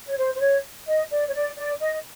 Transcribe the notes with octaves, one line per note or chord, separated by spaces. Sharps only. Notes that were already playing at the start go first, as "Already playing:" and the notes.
C#5
C5
C5
C#5
D#5
D5
C#5
D5
D5
D#5